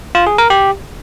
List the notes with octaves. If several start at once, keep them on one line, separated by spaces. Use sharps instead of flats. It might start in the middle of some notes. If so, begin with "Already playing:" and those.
F4
G#4
A#4
G4